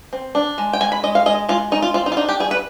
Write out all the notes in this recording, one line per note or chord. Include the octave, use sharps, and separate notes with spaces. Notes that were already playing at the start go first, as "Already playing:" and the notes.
C4
D4
G#3
G5
G#3 G#5
B5
G#3 D#5
F5
G#3 D#5
G#3 F4
G#3 D#4
F4
C4 F4
D#4
F4
D4 D#4
G4
G3 G#4
B4